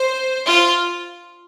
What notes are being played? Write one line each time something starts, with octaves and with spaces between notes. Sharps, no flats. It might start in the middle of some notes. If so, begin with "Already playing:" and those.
Already playing: C5
F4